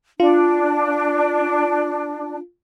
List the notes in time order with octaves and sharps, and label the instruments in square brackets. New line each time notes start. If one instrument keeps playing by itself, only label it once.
[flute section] D4 [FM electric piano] F4